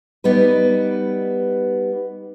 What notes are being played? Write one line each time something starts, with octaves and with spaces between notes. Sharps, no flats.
G3 B3 D#4 B4